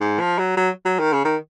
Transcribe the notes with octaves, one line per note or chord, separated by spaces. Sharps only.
G#2
F3
F#3
F#3
F#3
D#3
C#3
D#3